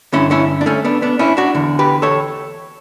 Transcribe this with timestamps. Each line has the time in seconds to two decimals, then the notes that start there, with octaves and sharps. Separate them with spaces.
0.13 G2 D3 C#4 E4
0.31 C#4 E4
0.61 D4
0.66 A3 C#4
0.85 B3 D4
1.02 B3 D4
1.19 C#4 E4
1.37 D4 F#4
1.55 E2 D3
1.79 G4 B4
2.02 A4 C#5